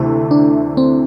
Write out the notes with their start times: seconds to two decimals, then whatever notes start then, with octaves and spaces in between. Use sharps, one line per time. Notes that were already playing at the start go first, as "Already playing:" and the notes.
Already playing: D2 C3 E3 A3 E4
0.31 D4
0.77 C4